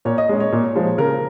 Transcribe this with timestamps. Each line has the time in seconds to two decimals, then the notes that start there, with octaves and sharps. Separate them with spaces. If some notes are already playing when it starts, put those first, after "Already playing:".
0.05 A#2 C#5
0.18 D#5
0.29 G#3 C#4
0.40 C#5
0.52 A#2
0.75 F3 G#3
0.98 C#3 A#4